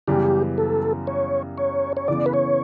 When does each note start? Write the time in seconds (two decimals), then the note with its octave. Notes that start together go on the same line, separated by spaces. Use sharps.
0.08 F#2 C#3 E3 G3 B3 G4
0.58 A4
1.07 C#5
1.58 C#5
1.97 C#5
2.08 C#3 E3 B3 D5
2.26 B4
2.34 C#5